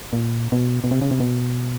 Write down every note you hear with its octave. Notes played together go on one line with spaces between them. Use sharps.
A#2
B2
B2
C3
C#3
C3
B2